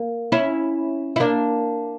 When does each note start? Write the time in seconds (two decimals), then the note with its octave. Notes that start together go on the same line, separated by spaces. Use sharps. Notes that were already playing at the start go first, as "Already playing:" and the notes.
Already playing: A#3
0.32 C#4 E4
1.16 E4
1.20 A#3 D4